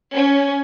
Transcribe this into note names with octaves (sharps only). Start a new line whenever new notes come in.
C#4